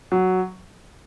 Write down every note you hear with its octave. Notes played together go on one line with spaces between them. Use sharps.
F#3